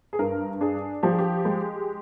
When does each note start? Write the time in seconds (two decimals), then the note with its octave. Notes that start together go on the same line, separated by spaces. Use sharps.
0.13 G#4
0.19 G2 A#4
0.61 D4 G#4
1.03 F3 G4
1.11 G#4
1.19 G4
1.45 G#3